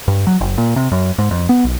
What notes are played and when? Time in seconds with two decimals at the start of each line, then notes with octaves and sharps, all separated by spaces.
0.08 G2
0.27 F#3
0.41 F#1
0.58 A#2
0.76 C3
0.92 F#2
1.18 G#2
1.31 F2
1.49 B3
1.64 B1